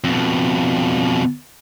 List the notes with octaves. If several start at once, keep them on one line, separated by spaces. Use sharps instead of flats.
F2 B2